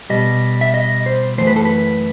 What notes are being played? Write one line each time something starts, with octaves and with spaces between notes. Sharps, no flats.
B2 G3 D#5
E5
D#5
C5
F#2 E3 A3 C5
B4
A4
B4